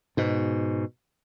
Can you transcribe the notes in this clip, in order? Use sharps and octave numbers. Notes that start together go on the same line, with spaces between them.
G#2 B2